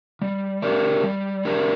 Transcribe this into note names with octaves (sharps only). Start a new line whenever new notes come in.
G3
D4 G4 A#4 D5
G3
D4 G4 A#4 D5